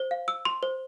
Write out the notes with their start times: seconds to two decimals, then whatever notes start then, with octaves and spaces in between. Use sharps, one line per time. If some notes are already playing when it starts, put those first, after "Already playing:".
Already playing: C5
0.11 F5
0.28 E6
0.45 C6
0.63 C5